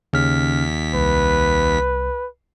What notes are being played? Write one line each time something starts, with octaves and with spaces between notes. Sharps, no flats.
D#2 C#3 C#4 F6 B6
C2 B4